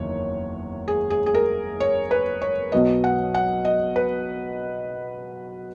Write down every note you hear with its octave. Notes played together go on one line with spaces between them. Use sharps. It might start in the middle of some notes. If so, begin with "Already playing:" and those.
Already playing: F#1 E2 D#3 C#5
G#4
G#4
G#4
A#4
C#5
B4
C#5
B1 B2 F#3 B3 D#5
F#5
F#5
D#5
B4